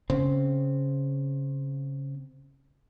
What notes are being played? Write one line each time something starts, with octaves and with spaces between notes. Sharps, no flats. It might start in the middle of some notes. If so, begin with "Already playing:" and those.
C#3 C4